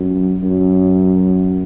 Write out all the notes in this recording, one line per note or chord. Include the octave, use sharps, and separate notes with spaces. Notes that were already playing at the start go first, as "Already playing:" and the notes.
Already playing: F#2
F#2